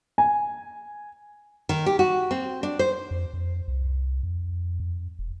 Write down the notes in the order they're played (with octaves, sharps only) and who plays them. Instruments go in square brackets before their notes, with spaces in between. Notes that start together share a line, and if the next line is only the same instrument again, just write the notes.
[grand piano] G#5
[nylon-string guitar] D#3
G4
F#4
C4
D4
C5
[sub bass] F2
F2
C2
F2
F2
E1